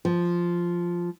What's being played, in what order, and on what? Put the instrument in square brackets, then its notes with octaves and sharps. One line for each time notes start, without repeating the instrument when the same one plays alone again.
[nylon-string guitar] F3